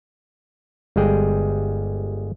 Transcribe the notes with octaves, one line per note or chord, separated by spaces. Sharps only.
G1 G3 G#3 G#4 G5